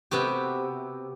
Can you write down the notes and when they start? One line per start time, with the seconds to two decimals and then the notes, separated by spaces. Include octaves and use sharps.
0.11 C3 B3 F#4 G4